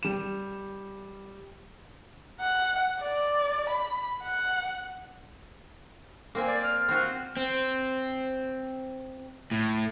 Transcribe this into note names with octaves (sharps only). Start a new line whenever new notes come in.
G3 E7
F#5
D5
B5
F#5
A#3 C4 G#5
D5
F6
C4 F4 F#4
C4
A2